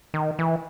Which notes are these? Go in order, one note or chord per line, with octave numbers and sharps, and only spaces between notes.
D#3
E3